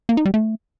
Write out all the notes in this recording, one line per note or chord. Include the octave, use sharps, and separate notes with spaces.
A#3
D#4
G3
A3